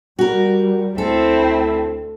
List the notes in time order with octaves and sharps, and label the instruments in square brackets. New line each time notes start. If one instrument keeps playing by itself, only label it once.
[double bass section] G3 [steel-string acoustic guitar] F#4 A#4
[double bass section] D2 [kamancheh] C4 E4 [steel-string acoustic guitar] A4